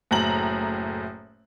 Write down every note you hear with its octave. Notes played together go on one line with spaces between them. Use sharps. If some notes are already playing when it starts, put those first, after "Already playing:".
F#1 A2 A#5 F#7